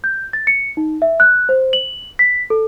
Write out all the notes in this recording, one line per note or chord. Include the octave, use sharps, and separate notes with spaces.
G6
A6
C#7
D#4
E5
F#6
C5
F#7
B6
A4